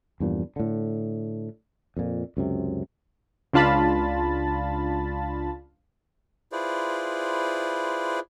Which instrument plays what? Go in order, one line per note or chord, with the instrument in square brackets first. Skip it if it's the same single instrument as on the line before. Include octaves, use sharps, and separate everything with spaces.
[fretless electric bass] E2 G2 A#2 F3
A2 D3
F2 A#2
C#2 F#2 C3
[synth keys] C#2 D4 F4 A5 B5 A6
[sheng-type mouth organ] E4 F4 G#4 B4 C5 D5